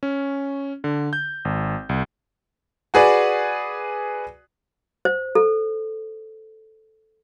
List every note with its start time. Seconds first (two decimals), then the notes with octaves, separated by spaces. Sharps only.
0.03 C#4
0.84 D3
1.13 G6
1.45 G#1
1.89 C2
2.94 F#4 G#4 B4 D5
5.05 C5
5.35 A4